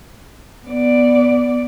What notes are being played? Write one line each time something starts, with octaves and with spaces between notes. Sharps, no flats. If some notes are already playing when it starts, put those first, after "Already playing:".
B3 D5